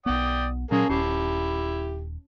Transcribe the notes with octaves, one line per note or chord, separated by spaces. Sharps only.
B1 B3 D5 G5 D#6
A#2 F#3 G#3 A#3 C#4 G#4 A5
D#1 E4 G4 C7